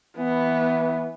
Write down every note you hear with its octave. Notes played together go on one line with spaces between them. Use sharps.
E3 B3